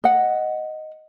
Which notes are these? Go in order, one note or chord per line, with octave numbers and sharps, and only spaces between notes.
D#5 F#5